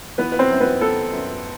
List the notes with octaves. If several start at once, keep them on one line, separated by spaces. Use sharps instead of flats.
E3 B3 B4
B4
C4 C5
F#2
B3 B4
B3 A4
F#2